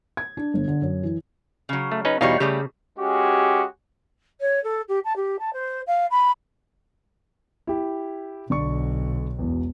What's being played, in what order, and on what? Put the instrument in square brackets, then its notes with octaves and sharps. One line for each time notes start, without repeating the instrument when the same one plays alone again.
[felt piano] G#6
D4
G1
D3
F#2
E3
[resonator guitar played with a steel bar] C#3 F#3
[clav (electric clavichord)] A3
C#4 D#4 B4
[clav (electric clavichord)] E2 B2 D#4 [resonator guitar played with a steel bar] G3 C#5 F5
[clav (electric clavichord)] C#3 [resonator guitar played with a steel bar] G3 A3 G4
[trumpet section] G#3 C#4 F#4 G4
[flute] C#5
A4
G4
A5
G4
A5
C5
F5
B5
[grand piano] E4 G4
[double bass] B1 [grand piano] D3 D5 C#6
[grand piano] E1 E2